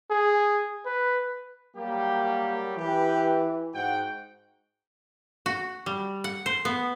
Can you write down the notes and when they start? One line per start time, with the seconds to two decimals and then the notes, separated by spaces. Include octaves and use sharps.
0.10 G#4
0.86 B4
1.77 F#3 G3 A#3 G4
2.78 E3 G4 B4
3.74 G#2 F#4 F#5 G5
5.46 F#4
5.86 G3
6.24 F#5
6.46 C5
6.65 B3